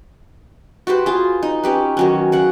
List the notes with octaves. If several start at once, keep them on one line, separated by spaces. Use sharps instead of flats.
F#4 G4 B4 C5
F4 G#4
D#4
C#4 G4 B4
D#3 F#3 C#4
C#3 F#5